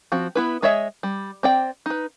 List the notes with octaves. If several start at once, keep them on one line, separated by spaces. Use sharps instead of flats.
F3 C4 F#4
B3 E4 B4
G#3 G#4 C#5 D#5 E5
G3
C4 D5 G5
D#4 B4